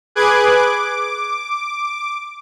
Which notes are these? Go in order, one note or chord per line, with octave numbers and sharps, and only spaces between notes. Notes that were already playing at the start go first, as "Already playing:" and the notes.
G#4 B4 D6 F#6 G#6
D6